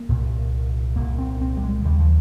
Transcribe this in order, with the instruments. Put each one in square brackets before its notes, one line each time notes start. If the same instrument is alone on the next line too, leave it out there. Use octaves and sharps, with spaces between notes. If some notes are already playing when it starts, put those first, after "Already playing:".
Already playing: [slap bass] A#3
C2 A#2
C2 A#2 A#3
C4
C4
G3
G#3
D#2 C#3 G3
F3